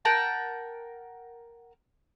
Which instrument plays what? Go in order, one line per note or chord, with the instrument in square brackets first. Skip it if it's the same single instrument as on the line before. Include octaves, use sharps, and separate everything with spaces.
[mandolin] A#4 F#5 G5 A5